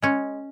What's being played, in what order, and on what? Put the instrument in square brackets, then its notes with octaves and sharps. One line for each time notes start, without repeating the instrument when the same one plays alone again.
[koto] G#3 C#4